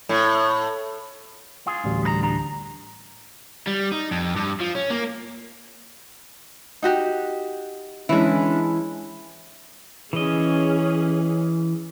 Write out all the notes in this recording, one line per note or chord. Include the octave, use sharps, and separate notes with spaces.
A2
F4 G#4
A1 D2 G3
G2 B4 A#5
D4 A#5
G3
D#4
F2
G2
F3
C#4
A#3
D#4 F#4 G4
E3 G#3 C#4 D4 E4
E3 C#4 G#4 D#5